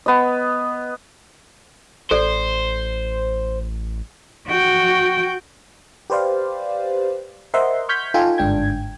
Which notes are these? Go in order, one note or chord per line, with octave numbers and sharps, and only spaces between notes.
B3 D#5
A1 A4 C5 D5
F#4 G5
G4 B4 C5 D5 F5
A#4 C5 D#5 E5 F#5 C6
C#6 F6 G6 G#6 B6
D#4 F4 A4 G5 G#5
G1 G#2 D4 G5 G#6